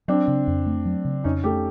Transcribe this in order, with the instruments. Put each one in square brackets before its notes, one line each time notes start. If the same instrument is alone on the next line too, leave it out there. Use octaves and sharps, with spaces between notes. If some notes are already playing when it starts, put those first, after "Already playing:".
[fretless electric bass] F#3 [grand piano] C4 D4
[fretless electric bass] C#3
F2
A3
F#3
C#3
[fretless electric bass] F2 [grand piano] C#4 D#4
[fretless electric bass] A3 [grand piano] G4 A4